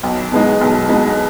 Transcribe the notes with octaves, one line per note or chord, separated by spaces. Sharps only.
B1
B2 G#3 D#4
B1
B2 G#3 D#4